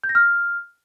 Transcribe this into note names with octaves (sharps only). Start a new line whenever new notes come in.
G6
A#6
F6